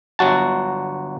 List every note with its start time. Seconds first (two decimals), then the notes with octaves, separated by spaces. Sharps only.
0.19 G1 F#3 F#4 A5